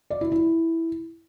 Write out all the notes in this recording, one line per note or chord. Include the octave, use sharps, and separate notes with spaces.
D5
E4
E4